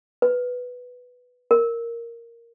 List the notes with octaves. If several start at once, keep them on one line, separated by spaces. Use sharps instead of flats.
B4
A#4